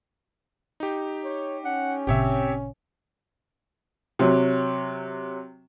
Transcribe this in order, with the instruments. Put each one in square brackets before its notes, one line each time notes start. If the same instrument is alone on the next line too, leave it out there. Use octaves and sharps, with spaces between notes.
[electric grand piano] D#4 G4
[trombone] C#5
[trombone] C#4 [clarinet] F#5
[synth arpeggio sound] G#1 A#2 C#3 [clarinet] C4 [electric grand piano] G4 C#5 E5
[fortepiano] C3 F#3